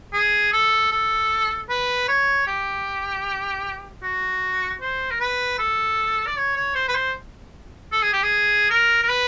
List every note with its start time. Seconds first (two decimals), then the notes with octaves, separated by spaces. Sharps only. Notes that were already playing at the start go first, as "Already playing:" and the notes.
0.13 G#4
0.52 A4
0.91 A4
1.69 B4
2.08 C#5
2.47 G4
4.03 F#4
4.81 C5
5.11 A#4
5.20 B4
5.58 A4
6.26 D5
6.37 C#5
6.56 C#5
6.75 C5
6.88 B4
6.95 C5
7.92 A4
8.02 G#4
8.13 G4
8.23 G#4
8.70 A#4
9.03 A#4
9.09 B4